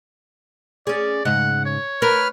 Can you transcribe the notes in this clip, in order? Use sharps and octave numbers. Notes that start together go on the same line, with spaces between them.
C#4 G#4 D5
G#2 C#3 D#5 F#5
C#5
A#4 B4 F6